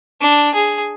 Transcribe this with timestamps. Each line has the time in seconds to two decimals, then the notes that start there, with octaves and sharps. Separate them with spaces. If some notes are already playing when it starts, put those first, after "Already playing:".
0.21 D4
0.54 G#4